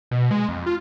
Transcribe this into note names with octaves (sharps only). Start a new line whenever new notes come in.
B2
G#3
F2
F4